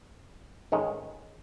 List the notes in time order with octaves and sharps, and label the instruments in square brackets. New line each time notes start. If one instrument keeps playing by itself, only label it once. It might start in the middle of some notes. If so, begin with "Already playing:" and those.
[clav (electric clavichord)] A1 G#2 D#3 G#3 C#4